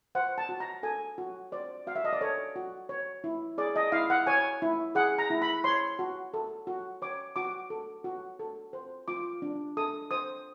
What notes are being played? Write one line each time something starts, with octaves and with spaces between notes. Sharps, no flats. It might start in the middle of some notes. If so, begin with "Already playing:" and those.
C5 F#5
A5
F#4
A#5
A4 G#5
F#4
C5 D5
F#4 F5
E5
D#5
D5
A4 C#5
F#4
C#5
E4
G#4 D5
D#5
E4 F5
F#5
C#5 G#5
E4
G#4 F#5
A#5
E4
B5
C#5 C6
F#4
A4
F#4
C#5 D6
F#4 D6
A4
F#4
A4
C5
F4 D6
D4
A4 D#6
C5 D#6